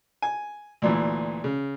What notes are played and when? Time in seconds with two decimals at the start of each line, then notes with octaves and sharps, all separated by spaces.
0.22 G#5
0.82 D2 A#2 E3
1.44 C#3